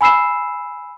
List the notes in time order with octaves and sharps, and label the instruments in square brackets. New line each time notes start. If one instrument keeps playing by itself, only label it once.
[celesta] G#5 B5 E6 C7 E7